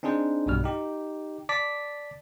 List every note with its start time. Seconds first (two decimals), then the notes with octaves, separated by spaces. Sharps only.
0.03 C4 D4 D#4 G#4 C5
0.46 B1 G2 B2 G3 F6
0.64 D#4 G4
1.49 D5 A5 D6 B6